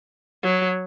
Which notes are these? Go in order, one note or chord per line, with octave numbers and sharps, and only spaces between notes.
F#3